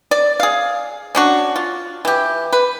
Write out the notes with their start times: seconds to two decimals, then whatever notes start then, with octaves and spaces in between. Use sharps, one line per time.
0.11 D5
0.40 G#4 F5
1.15 C#4 D4 F#4
1.56 F4
2.05 E3 G4
2.53 B4